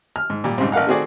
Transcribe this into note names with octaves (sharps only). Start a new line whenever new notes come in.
F6
G#2
A#2 G3
G#2 C#3 G3 C4
A1 A#3 F5 F#5 F6
D#3 A3 C4 F#4 G#4 D5